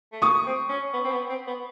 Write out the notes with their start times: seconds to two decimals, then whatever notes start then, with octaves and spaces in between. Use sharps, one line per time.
0.12 A3
0.22 A#3 C#6 D#6
0.46 C4
0.69 C#4
0.94 B3
1.05 C4
1.11 B3
1.29 C4
1.47 B3